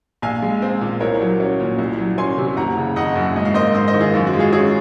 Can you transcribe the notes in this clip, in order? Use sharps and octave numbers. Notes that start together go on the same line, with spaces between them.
A#1 F5 G#5
G#3
C4
A#2
C2 A#4 C#5
F#3
C#4
A#2
C2
F#3
C#4 G#5 C6
C3
F#1 F#5 A#5
C#3
F#1 D#5 F#5
F#2
G#2 D#5
F5
A#3 C5 D#5
G#2 C5 D#5
C5 D#5
D#3
F4 G#4
F#2 F4
F#4
G#3
F4 G#4
C#4 F4 G#4